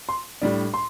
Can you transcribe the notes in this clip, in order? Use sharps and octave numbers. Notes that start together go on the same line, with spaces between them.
C6
A2 G3 D4
C6